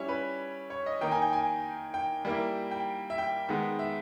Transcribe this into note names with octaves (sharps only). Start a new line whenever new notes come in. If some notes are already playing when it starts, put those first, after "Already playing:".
Already playing: G3 C#4 E4 C#5
B4
C#5
D#5
D#3 A#3 D#4 G5
G#5
G5
G#5
G5
G3 A#3 E4
G5
E5
G5
D#3 G#3 B3
E5